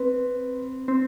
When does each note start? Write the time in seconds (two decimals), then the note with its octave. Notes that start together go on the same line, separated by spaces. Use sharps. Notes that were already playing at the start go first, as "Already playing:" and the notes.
Already playing: C4 B4
0.88 C4